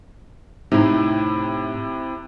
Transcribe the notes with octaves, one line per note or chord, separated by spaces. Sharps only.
A2 C3 D#4 E4